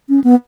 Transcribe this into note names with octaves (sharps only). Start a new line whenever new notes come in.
C#4
B3